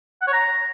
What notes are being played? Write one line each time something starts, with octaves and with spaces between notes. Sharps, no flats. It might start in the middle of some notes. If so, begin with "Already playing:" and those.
F#5
C#5
A#5